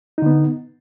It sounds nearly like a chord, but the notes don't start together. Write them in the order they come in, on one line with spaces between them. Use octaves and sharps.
D#4 D3 B3